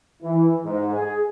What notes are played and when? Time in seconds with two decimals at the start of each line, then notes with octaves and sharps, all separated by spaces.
0.22 E3
0.65 G#2
0.94 G#4